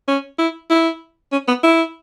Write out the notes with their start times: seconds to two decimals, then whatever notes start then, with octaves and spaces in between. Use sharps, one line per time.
0.08 C#4
0.39 E4
0.70 E4
1.32 C#4
1.48 B3
1.63 E4